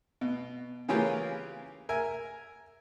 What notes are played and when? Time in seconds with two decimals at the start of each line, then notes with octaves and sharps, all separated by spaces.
0.21 B2
0.88 C#3 E3 C#4 F4 G4 A#4
1.89 A#4 E5 G#5